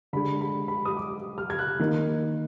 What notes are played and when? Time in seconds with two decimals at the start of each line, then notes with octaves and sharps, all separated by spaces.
0.13 D3 G#3 D4 B5
0.41 B5
0.68 B5
0.85 D#6
0.97 D6
1.38 F6
1.50 G#6
1.59 F#6
1.79 D#3 A#3 D#4